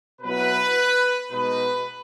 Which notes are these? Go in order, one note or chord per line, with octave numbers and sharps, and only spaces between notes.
B2 F#3 B3 E4 B4
B2 G#3 D#4 B4